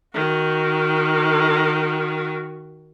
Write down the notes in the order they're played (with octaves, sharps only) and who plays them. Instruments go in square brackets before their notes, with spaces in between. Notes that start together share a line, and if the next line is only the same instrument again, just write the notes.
[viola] D#3 F#4